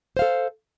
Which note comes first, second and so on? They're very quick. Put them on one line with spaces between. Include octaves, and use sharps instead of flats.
C5 F5 A4